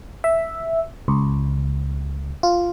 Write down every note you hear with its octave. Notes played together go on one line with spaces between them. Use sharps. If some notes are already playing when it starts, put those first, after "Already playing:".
E5
C#2
F4